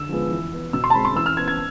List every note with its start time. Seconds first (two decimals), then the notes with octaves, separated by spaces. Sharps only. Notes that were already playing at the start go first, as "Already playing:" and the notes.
Already playing: D3 E6
0.09 F3 G#3 B3
0.31 E3
0.52 B3
0.73 B2 E6
0.84 C6
0.90 A5
0.94 G#3 C4 B5
1.05 C6
1.15 E3 E6
1.26 F6
1.37 B3 G#6
1.48 G#6